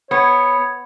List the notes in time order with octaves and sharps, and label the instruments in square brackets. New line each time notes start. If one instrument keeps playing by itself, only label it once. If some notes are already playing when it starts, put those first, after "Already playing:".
[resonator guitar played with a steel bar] B3 [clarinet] C#5